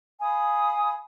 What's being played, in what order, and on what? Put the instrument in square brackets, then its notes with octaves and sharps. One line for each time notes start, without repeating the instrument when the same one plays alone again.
[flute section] F5 G#5 B5 D#6